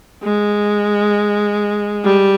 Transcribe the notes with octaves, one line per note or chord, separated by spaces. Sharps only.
G#3
G3